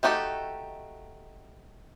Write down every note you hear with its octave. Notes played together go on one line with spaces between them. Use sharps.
A3 D#4 F#4 G4 A4